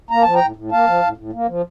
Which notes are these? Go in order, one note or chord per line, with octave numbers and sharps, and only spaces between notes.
A#3 A#5
F3 A5
G5 A#5
A2
A2
A#3 F5 A5
F3
A2
A2
A#3
F3